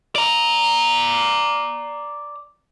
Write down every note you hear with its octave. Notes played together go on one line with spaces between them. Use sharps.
D5 A#5